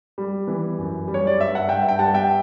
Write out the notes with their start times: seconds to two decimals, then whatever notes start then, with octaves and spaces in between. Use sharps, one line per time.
0.18 G3
0.47 E3
0.78 F#2
1.08 G3
1.14 C#5
1.27 D5
1.38 G2 E5
1.55 F#5
1.68 G2 E5 G5
1.88 G5
1.99 G3 F#5 A5
2.14 E5 G5